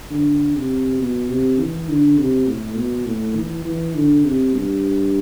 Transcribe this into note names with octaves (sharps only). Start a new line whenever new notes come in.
D3
C3
B2
C3
E3
D3
C3
A2
B2
A2
E3
E3
D3
C3
G2